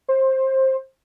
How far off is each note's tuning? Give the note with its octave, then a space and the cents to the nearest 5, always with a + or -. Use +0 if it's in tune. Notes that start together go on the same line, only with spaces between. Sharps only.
C5 +20